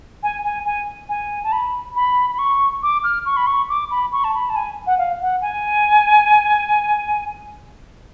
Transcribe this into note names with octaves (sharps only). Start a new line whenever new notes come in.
G#5
G#5
G#5
G#5
A5
B5
B5
B5
C#6
D6
F6
C#6
B5
C#6
D6
B5
C#6
A5
B5
A5
G#5
F#5
F5
F#5
G#5